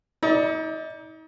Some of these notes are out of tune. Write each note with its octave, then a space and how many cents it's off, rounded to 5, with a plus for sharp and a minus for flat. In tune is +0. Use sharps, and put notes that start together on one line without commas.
D#4 +35 D5 +0